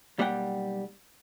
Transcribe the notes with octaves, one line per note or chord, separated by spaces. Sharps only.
B1 G3 A#3 C5 F#5 G5